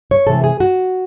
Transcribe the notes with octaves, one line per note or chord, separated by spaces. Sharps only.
C#5
C3 E3 G#3 A4
G#4
F#4